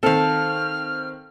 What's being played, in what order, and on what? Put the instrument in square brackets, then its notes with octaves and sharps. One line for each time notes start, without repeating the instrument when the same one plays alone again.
[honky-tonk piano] D#3 C4 [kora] A4 F5 [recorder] F6